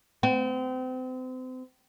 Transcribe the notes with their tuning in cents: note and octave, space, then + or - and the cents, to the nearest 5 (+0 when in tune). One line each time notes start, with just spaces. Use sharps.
C4 -35